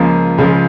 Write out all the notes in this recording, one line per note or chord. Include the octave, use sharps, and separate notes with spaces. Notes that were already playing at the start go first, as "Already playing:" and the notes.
Already playing: C#2 C#3 F3 A#3
C#2 C#3 F3